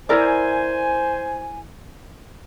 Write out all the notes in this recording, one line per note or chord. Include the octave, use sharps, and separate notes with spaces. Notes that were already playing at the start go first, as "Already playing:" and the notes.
E4 A#4 C5 D5 G#5